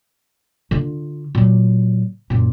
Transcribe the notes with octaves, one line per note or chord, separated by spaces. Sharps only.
D3 F4
A#2 F#3
F#2 A#2